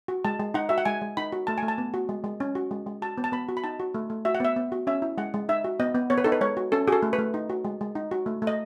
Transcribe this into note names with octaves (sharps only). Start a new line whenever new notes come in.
F#4
G#3 A5
G#3
D#4 F#5
F#4 E5
F#5
G#3 G#5
G#3
D#4 B5
F#4
A3 A5
G#5
A3
A5
B3
F#4
G#3
G#3
C#4
F#4
G#3
G#3
F#4 A5
B3
A5
B3 B5
F#4
B5
D#4 A5
F#4
A3
A3
F#4 E5
F#5
B3 E5
B3
F#4
C#4 E5
E4
G#3 F#5
G#3
D#4 E5
F#4
B3 D#5
B3
B3 C#5
B4
D#4 A4
B4
G#3 C#5
F#4
C#4 A4
F#4 G#4 A4
A3
B4
A3
D#4
F#4
G#3
G#3
D#4
F#4
A3
A3
D#5